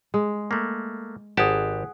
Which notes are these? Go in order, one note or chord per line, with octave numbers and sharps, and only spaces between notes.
G#3
A3 A#3
G#1 G4 G#4 F#5 A5